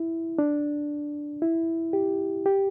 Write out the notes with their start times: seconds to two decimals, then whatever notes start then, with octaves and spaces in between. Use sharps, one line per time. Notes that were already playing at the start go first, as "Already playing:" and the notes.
Already playing: E4
0.38 D4
1.42 E4
1.93 G4
2.46 G4